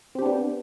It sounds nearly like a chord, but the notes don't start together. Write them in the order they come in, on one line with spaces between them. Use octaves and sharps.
C4 G4 D4 B3